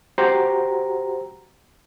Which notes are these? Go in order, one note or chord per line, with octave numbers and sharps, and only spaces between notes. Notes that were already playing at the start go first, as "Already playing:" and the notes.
F#4 G4 C5 A#5